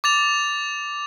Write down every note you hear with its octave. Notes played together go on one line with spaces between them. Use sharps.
D6 A6 F7